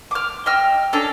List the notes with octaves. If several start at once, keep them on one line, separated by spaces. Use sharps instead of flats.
D6 F6
D#5 G5 E6 F6
C#4 D4 A4 A#5